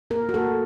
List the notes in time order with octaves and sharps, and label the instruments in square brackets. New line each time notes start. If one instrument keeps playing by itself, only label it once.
[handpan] A#3 A#4
F#4
A#3 A4